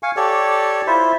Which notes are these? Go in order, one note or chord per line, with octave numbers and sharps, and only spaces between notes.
F5 G#5 C#6
G4 A4 C#5 D5
E4 F4 C5 E5